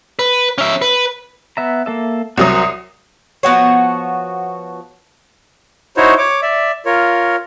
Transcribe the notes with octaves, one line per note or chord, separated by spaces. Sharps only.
B4
C#4 E5
B4
B3 E5 A#5
A#3 A4 E5
C2 F#3 F#4 A#4 C5 D#6
F3 B3 F#4 C#5
D#4 E4 F#4 C5 C#5
C#5 D6
D5 E5
F4 A#4 C#5